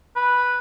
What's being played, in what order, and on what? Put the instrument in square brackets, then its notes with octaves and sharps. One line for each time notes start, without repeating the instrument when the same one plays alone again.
[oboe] B4